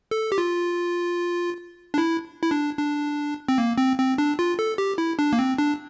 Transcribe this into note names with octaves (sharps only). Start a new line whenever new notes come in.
A4
G4
F4
D4
E4
E4
D4
D4
C4
A#3
C4
C4
D4
F4
A4
G4
E4
D4
A#3
C4
D4